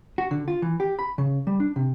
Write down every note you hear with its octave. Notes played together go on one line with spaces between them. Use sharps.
F#4
D3
F4
E3
G4
B5
C#3
G3
D4
C3